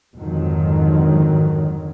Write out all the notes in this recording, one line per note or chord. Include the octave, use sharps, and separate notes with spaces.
F2 G#2 D3 D#3 F#3